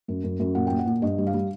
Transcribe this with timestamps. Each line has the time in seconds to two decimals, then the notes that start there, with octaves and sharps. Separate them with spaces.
0.08 F#2
0.24 F#2
0.40 F#2
0.55 A#2 F#5
0.67 A#2 G5
0.79 F#5
0.86 A#2
1.02 G2 D#5
1.18 G3
1.27 F5
1.34 G3